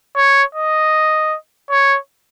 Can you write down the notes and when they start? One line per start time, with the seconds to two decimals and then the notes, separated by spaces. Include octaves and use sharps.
0.16 C#5
0.55 D#5
1.71 C#5